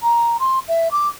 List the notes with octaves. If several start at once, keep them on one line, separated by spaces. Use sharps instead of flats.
A#5
C6
E5
D6